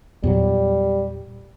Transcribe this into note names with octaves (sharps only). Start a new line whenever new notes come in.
E2 A#2 F#3 G3